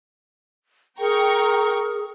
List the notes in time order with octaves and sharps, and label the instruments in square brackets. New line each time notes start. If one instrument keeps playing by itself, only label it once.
[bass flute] G#4 [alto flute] A#4 [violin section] G5 A#5 C#6